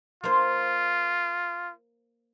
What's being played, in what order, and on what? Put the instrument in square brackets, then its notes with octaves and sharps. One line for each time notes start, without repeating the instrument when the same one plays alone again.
[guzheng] A#3 C5 [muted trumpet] F4